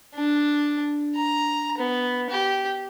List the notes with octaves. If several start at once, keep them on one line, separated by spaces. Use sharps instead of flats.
D4
A#5
B3
G4